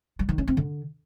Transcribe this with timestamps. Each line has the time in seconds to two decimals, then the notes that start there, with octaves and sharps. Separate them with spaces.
0.19 G3
0.29 D#3
0.38 C#4
0.48 C4
0.57 D3